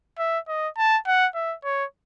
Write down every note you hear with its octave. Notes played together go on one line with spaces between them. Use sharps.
E5
D#5
A5
F#5
E5
C#5